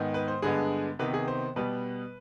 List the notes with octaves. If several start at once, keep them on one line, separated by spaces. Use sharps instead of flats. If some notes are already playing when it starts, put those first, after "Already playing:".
Already playing: G#2 D#3 B3
B4
C5
G2 D3 G#3 B3 G#4
C3 D#3 B3 B4
G#4
C5
B2 G3 B3 B4